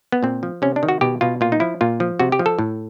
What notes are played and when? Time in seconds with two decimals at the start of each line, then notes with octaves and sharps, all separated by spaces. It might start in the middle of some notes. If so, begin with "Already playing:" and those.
0.12 B3
0.23 A#2 C4
0.43 F3
0.62 C3 C#4
0.76 D4
0.83 D#3
0.89 F#4
1.01 B2 G4
1.21 B2 F4
1.41 A#2 F4
1.52 D#4
1.60 F3 E4
1.81 A#2 F4
2.00 F3
2.20 C3 F#4
2.32 G4
2.39 F3
2.46 A4
2.59 A2